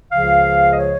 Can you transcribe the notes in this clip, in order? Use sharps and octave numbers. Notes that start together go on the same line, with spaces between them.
C#2 C#3 F3 F5
D#5
C#5